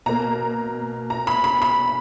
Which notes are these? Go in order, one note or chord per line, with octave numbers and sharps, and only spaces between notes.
B2 A#3 A#5
A#5
B5
B5
B5